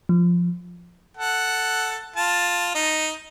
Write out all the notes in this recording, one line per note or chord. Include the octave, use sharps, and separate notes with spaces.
F3
A4 F#5
F4 A5
D#4